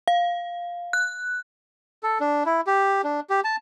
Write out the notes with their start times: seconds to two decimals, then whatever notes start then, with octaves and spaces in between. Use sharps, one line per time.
0.08 F5
0.93 F#6
2.03 A4
2.20 D4
2.46 E4
2.67 G4
3.04 D4
3.30 G4
3.44 A5